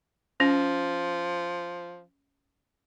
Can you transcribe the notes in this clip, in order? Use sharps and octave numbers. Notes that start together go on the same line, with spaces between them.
F3 C#4